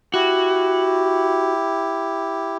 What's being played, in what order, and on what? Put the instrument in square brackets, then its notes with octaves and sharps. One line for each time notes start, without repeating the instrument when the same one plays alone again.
[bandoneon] E4 G4 [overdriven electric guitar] F#4